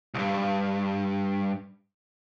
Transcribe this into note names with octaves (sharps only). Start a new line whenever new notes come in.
C2 G2